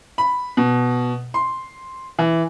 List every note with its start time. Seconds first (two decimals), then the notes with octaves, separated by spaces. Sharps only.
0.18 B5
0.57 B2
1.34 C6
2.19 E3